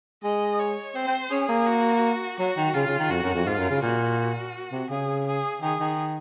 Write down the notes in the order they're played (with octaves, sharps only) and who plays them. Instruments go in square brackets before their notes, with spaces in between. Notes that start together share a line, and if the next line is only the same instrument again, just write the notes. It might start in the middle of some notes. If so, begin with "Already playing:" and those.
[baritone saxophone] G#3 [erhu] D#5
[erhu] C#5
[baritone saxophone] C4 [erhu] C5
[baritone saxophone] C4
[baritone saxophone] C#4 [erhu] G#4
[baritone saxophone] A#3
[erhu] F#4
[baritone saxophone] F#3 [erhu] F#4
[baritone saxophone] D#3
[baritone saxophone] C#3 [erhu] F4
[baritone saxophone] C#3
D#3
[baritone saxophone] F2 [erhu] F#4
[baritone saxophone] F#2
F2
[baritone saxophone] G#2 [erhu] F4
[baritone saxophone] F#2
C#3
[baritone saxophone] A#2 [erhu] F#4
[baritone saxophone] C3
[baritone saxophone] C#3 [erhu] G#4
[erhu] G#4
[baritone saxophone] D#3 [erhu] G#4
[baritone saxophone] D#3